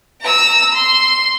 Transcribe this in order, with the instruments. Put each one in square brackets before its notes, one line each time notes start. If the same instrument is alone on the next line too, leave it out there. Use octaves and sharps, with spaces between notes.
[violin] A#5 E6
C6